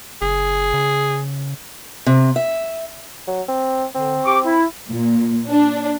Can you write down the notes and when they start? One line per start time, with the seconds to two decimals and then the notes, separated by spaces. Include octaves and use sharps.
0.22 F#1 G#4
0.74 C#3
2.06 C3
2.36 E5
3.28 F#3
3.48 C4
3.95 D3 C4
4.25 G4 C#6 D6
4.45 E4
4.90 A#2
5.48 D4